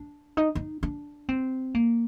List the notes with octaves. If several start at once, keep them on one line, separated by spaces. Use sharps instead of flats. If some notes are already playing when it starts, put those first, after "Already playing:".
Already playing: D4
D#4
D#4
D4
C4
A#3